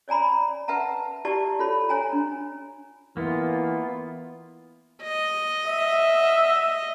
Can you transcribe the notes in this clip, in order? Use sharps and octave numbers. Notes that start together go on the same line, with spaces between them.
C#5 D5 G#5 A#5 B5
B4 E5 F#5 A5 A#5
E4 G4 D5 A5 C#6
F4 A4 C#5 B5
C#5 G#5 A#5
D4
E3 A#3 B3 F4
D#5
E5